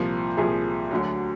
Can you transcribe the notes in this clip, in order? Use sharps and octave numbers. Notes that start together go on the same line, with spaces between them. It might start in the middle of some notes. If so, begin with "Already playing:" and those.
Already playing: C2 A#2 F3
C2 A#2 F3 G#4
D2 D3 F#3